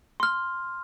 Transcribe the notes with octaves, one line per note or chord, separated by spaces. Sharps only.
C6 F6